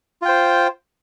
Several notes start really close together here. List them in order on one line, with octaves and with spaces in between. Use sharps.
F4 G5 C5